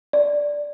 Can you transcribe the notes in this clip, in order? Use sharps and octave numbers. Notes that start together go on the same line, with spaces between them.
D5